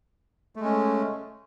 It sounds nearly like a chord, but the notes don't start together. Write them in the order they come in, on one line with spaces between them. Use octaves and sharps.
A3 G#3 C#4